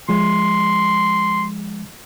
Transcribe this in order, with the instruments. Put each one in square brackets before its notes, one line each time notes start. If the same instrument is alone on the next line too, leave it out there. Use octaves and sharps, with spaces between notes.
[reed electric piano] F3 G#3 [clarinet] C6